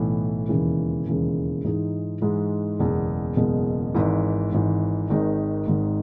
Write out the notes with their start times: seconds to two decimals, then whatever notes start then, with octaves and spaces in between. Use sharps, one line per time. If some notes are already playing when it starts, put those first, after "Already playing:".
Already playing: B1 A2 E3 B3
0.49 E1 D#2 C#3 E3 G#3
1.06 E1 D#2 C#3 E3 G#3
1.64 G#2 E3 G#3 D#4
2.22 G#2 E3 G#3 D#4
2.79 F#1 E2 B2 G#3
3.36 F#1 E2 B2 G#3
3.94 G#1 G#2 E3
4.52 G#1 G#2 E3
5.10 G#1 G#2 D#3 G#3 D#4
5.67 G#1 G#2 D#3 G#3 D#4